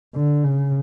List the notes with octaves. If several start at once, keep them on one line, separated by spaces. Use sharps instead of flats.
D3
C#3